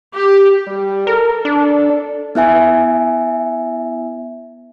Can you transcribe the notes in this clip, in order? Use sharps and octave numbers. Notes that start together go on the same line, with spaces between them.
G4
G3
A4 A#4
D4
B3 E4 E5 G#5